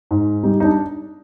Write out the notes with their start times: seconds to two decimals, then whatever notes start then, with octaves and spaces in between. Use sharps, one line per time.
0.11 G#2
0.43 G3 D#4
0.60 D#4
0.64 D4